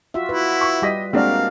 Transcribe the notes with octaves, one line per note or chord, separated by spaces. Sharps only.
F4 F#4 E5
E4 F#4 B4
C#6
G3 G4 D#5 B6
G#3 A#3 C4 D4 F#4 A#4 F5